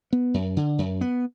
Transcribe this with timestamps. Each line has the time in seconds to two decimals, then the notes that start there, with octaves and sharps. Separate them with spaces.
0.13 B3
0.34 F#2
0.57 D3
0.78 F#2
1.01 B3